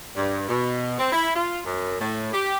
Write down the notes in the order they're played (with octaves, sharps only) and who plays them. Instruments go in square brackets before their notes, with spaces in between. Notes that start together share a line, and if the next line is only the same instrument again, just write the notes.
[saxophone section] G2
B2
C4
E4
F4
F#2
A2
G4